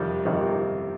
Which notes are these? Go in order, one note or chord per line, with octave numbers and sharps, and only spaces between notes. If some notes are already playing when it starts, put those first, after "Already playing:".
Already playing: F2 C3 D#3 G3
F2 C3 D#3 G3